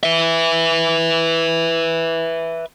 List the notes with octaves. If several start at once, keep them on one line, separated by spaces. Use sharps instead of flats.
B4 E5